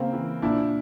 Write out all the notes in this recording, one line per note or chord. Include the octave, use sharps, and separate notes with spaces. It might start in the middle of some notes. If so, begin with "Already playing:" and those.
Already playing: C#3 A#3 C4
E3
A#2 D4 E4